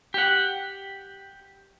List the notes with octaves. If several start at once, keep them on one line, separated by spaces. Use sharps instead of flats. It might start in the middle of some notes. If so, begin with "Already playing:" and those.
G4 F#5